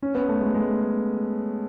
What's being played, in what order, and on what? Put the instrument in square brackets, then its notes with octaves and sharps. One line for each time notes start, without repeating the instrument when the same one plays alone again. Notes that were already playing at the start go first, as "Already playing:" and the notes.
[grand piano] C#4
B3
A3
G#3
G#3